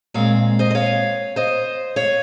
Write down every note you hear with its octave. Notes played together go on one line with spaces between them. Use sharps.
A#2 G#3 C4 C#5 F5
C5 D#5
D#5
C#5 F5
C5 D#5
C#5 F5